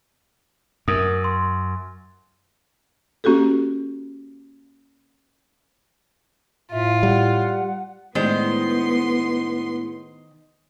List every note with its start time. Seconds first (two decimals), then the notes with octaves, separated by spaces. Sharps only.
0.88 F#2 A#4 D#6
1.24 C6
3.24 A#3 C#4 F#4 G4 A4
6.72 A2 F4 E5
7.03 G3 F#5
8.15 A2 D#3 G#3 B3 D4 C5 C6